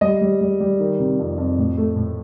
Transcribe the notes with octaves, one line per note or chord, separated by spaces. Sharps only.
G3 D#5
G3
G3
G3
D#3
C3
F2
F2
A2
A3
A2